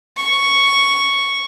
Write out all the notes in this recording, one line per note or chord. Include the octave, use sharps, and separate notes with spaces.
C#6